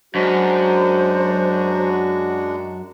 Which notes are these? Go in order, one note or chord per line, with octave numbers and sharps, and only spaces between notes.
F#2 G#3 D4 F#4 C5